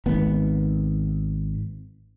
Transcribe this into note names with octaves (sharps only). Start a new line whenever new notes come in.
G#1 B3